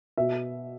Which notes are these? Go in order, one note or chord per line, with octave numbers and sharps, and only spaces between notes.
B2 E5